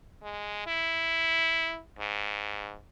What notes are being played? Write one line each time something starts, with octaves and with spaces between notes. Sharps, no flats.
G#3
E4
G#2